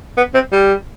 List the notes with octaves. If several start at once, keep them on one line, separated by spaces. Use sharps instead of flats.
B3
C4
G3